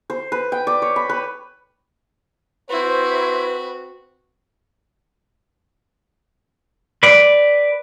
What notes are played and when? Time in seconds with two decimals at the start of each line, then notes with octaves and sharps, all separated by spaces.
0.10 C5
0.32 B4
0.52 G5
0.67 D5
0.82 C#5
0.96 B5
1.09 B4
2.69 C4 E4 F#4 B4 C5 C#6
7.03 B4 D5